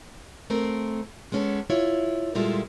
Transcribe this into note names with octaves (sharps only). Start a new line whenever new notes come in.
A3 C4 A#4
G#3 B3 C#4 G4 A4
E4 F4 C#5
A#2 G3 G#3 E4 F4 A4